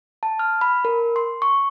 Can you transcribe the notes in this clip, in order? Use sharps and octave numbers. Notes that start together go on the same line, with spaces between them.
A5
F6
B5
A#4
C6
C#6